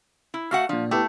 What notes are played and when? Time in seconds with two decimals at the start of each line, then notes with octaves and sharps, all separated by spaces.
0.34 E4
0.51 A3 F#4 F5 F#5
0.69 A#2 F3 D4
0.91 A3 B3 E4 G4